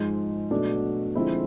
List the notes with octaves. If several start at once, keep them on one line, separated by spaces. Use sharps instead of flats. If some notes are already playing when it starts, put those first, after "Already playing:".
Already playing: G#2 F3 G#3
B2 F#3 A3 D4
D3 F3 G#3 C4 E4